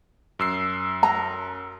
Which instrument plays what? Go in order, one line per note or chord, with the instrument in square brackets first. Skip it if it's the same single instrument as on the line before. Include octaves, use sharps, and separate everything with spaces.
[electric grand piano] F#2 E6 C7
[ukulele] A#5